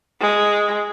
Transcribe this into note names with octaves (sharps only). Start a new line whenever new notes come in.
G#3